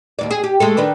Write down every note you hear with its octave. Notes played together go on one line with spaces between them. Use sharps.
D#2 G#2 D5
G#4
G4
G#3 A3 A4
D#3 D4 B4